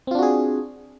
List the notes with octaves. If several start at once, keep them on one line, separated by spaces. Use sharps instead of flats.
C4 D4 F4 F#4 G#4